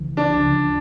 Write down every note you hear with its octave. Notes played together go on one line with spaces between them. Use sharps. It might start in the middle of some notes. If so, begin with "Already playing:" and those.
Already playing: C#2 C#3 E3
D4
D2 C#3 F3